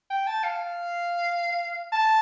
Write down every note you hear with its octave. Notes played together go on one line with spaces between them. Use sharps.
G5
A5
F5
A5